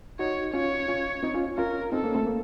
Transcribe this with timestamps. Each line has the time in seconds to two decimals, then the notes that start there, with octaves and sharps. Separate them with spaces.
0.19 D#4 F#4 C#5
0.54 C#4 F4 C#5
0.88 C#4 F4
1.23 C4 D#4
1.34 C#4 F4
1.58 C#4 F4 A#4
1.92 C4 D#4 A4
2.04 A#3 C#4
2.15 A3 C4
2.27 A#3